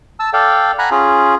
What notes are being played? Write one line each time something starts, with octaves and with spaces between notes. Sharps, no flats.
A5 E6
A4 D5 F5 G5
F#5 G#5 A#5 B5 F#6
C#4 F4 G#4